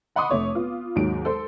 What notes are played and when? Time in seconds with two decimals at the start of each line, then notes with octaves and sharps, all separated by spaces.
0.16 D#5 F#5 B5 C6 D6 D#6
0.30 F1 A3 C#5 C#6
0.55 B3 F4
0.96 D#2 G#2 F#3 D7
1.25 A4 C5